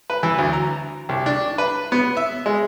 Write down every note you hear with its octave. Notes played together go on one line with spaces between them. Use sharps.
B4
E3
D2
A#5
C2
D4
B4
B3
E5
G#3